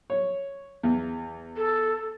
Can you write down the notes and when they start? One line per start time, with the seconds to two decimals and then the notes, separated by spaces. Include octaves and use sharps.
0.10 C#5
0.83 E2
1.57 A4